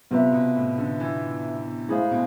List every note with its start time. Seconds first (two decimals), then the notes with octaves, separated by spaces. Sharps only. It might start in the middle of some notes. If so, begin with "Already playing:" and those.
0.11 C3 B3 F4 B4 E5
0.33 B2
0.56 A2
0.78 D3
1.00 E3
1.89 G#3 A3 E4 G#4 C5 F5
2.11 B2